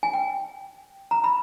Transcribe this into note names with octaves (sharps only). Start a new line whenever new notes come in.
G#5
G5
A#5
B5